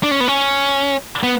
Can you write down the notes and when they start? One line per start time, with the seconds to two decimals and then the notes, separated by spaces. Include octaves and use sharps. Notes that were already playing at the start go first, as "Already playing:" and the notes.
0.03 D4
0.11 C#4
0.20 B3
0.28 C#4
1.23 B3